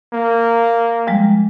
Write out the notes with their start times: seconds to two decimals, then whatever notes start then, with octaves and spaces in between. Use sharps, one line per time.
0.13 A#3
1.07 F3 G3 G#3